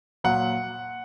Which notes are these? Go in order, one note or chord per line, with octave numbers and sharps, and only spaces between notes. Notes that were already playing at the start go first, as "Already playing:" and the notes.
A#2 F#3 F#5